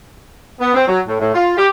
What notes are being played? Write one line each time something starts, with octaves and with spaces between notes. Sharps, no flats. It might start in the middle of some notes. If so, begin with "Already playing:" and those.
B3
C4
F#3
A2
A2
F4
G4